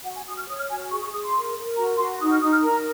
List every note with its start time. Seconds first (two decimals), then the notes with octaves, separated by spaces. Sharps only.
0.05 F#4 F#5
0.16 G#5
0.26 F#4 D#6
0.38 F6
0.48 C#5 D#6
0.59 F6
0.69 F#4 G#5
0.91 G#4 C#6
1.02 C#6
1.12 G#4 D#6
1.23 C6
1.35 A#4
1.56 A#4
1.77 F#4 A#5
1.98 F#4 C6
2.21 D#4 D#6
2.30 F6
2.42 D#4 D#6
2.52 F6
2.63 A#4 A#5